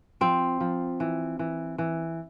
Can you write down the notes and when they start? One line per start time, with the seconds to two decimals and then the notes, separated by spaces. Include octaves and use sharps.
0.21 F3 C4
0.60 F3
1.00 E3
1.39 E3
1.78 E3